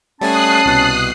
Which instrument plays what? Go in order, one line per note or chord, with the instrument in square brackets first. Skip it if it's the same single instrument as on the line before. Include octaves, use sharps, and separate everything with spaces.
[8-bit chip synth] G3 A3 G#5 [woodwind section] C#4 A5 [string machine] D#6 F#6 C7
[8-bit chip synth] C2 B2